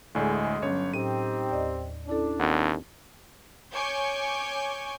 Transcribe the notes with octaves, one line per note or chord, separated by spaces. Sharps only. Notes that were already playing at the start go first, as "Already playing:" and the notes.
D2 A2 G#3 D5 G#5
G1 F#3 C#4 C#5
A2 C4 D#4 G4 D#7
D#2 D5 D#5
C#4 D4 E4 A4
D#2 C4 F#5
C#5 G#5 C#6 D6 G6